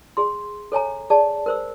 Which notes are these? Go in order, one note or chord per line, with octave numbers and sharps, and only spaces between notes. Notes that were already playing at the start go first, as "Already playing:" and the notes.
G#4 C6
A4 C#5 G#5 A#5
G#4 D5 A5
A#4 C5 E6